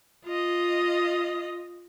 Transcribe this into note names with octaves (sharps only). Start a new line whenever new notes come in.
F4 D#5